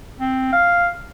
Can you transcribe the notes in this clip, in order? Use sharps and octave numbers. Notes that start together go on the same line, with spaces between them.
C4
F5